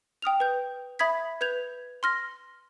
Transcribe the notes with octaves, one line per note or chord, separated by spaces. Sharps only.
G5 D#6 F6 F7
B4 G6
E5 B5 D#6 G#6 B6
B4 G6 G#6 F7
C6 F6 A#6